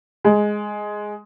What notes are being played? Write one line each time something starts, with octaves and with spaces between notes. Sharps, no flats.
G#3